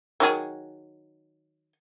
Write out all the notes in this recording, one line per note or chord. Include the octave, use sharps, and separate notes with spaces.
D#3 F#3 G#4